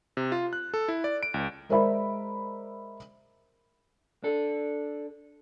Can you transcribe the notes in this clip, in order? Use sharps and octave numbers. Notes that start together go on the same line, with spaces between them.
C3
F4
F#6
A4
E4
D5
D7
C#2
G#3 A#4 C5 D5 E5 B5
D4 A4